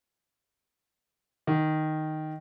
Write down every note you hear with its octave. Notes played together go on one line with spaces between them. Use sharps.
D#3